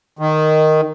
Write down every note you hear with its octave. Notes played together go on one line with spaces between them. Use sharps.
D#3